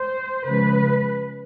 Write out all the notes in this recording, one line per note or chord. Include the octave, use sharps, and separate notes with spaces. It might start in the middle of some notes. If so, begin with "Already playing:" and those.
Already playing: C5
C#3 F3 G#3 B4